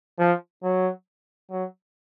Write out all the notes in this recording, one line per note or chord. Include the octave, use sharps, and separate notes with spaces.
F3
F#3
F#3